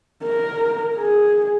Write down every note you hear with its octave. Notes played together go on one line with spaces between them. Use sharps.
A#4
G#4